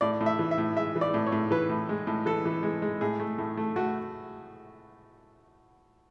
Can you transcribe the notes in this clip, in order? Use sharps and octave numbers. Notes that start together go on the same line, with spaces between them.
A2 D5
A2
E5
E3
E5
A2
G#3 E5
E3
D5
A2
C#5
A2
E3 B4
A2
G#3
A2
E3 A4
E3
G#3
G#3
A2 G#4
A3
A2
A3
A3 F#4